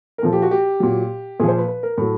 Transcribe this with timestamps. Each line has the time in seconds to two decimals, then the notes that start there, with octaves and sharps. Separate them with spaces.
0.18 A#4
0.22 A#2 F3 A4
0.33 G4
0.42 F#4
0.51 G4
0.80 A#2 F#3
1.40 A#2 F3 G#4
1.48 C5
1.58 B4
1.68 B4
1.83 A#4
1.98 A2 F#3 A4